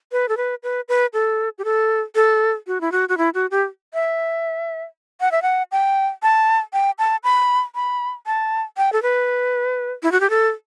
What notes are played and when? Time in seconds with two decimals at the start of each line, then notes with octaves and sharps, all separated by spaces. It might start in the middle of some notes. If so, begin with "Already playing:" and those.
0.12 B4
0.29 A4
0.37 B4
0.63 B4
0.88 B4
1.13 A4
1.58 G4
1.65 A4
2.15 A4
2.67 F#4
2.81 E4
2.92 F#4
3.09 F#4
3.18 E4
3.34 F#4
3.51 G4
3.94 E5
5.21 F#5
5.32 E5
5.42 F#5
5.72 G5
6.23 A5
6.73 G5
6.99 A5
7.24 B5
7.75 B5
8.26 A5
8.77 G5
8.93 A4
9.02 B4
10.03 E4
10.12 F#4
10.20 G4
10.30 A4